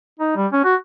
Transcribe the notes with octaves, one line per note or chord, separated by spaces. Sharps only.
D#4
G3
C#4
F#4